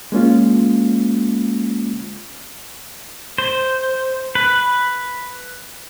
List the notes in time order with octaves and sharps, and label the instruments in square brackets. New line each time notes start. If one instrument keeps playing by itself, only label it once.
[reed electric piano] G#3 A#3 C#4 F4
[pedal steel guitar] C5
B4